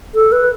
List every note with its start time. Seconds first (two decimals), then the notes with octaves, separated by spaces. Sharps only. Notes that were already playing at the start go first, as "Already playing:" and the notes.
0.15 A4
0.32 B4